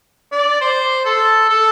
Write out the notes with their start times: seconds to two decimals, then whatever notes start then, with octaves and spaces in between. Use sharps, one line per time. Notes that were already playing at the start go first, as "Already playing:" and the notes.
0.32 D5
0.61 C5
1.05 A4
1.50 A4